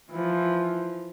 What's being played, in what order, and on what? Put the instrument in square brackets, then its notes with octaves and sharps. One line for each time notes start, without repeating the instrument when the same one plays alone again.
[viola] E3 F3